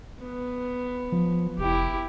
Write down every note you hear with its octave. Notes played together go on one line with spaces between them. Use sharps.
B3
F3
F1 E4 G4